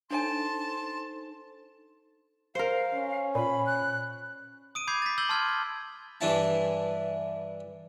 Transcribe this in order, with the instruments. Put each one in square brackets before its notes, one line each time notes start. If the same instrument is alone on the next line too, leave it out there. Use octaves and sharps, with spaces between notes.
[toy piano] D4 C#5 G#5 [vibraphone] D#4 A4 C5 [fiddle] A5 [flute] C6
[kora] A#4 C5 [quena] F5
[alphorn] C#4
[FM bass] A#2 [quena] B5
[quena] F#6
[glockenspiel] D#6 D7 D#7
B5 D6 G6 G#6 C7
A6 B6
E6 G6 A6 B6 F#7 G7
A5 C6 E6 F6 G#6
G#6
[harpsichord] G2 E3 D4 E4 A5